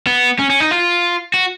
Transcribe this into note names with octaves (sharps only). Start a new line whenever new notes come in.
B3
C#4
C#4
D#4
F4
F#4